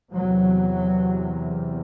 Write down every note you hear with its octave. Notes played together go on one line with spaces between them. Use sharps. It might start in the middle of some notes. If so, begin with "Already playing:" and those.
E2 C3 F#3